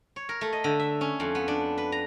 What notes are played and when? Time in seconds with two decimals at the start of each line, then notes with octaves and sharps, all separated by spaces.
0.16 C#5
0.29 A#4
0.41 A3
0.53 D#5
0.64 D3
0.79 E5
1.01 C#4
1.20 F2
1.35 B3
1.48 D4
1.78 B4
1.92 A#5